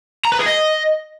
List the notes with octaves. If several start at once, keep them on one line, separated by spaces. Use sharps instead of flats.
A#5
B4
G#4
D#5